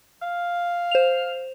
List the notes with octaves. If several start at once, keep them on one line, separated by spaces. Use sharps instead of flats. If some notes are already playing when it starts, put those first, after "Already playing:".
F5
C5 F7